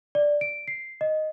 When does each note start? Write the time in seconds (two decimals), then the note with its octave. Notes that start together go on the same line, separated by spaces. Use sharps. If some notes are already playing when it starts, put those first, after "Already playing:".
0.15 D5
0.41 D7
0.68 C7
1.01 D#5